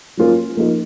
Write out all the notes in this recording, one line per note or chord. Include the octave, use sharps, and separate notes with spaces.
F#3 A#3 C#4 F4 A#4
F3 A#3 D#4 A#4